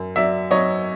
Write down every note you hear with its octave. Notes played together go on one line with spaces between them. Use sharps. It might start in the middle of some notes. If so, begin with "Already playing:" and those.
Already playing: F#2
F#3 D5 E5
F#3 C#5 D#5